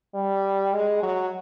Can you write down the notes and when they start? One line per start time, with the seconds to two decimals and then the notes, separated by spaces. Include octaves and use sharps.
0.15 G3
0.73 G#3
1.03 F#3